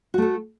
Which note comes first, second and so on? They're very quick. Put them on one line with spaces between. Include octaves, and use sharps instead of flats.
F#4 A3 A4